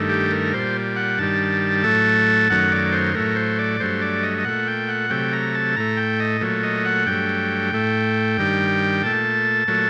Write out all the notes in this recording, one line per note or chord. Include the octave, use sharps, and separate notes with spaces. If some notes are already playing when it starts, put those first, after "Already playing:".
Already playing: G2 D#3 A3
G4
A#4
A#2 G3 C5
F#5
G2 D#3 G3 A5
A2 F#3 A3
F#2 D#3 F#3 A3 F#5
D5
C5
A2 F#3 A3 A#4
C5
D5
G2 F#3 A3 C5
D5
D#5
D#5
A#2 A3 F#5
G5
F#5
C3 F#3 A3 G5
A#5
A5
A2 A3 A#5
G5
D#5
A#2 F#3 A3
D#5
F#5
G2 F#3 A3 G5
A2 A3
G2 D#3 G3
A#2 A3 A5
A#2 F#3 A3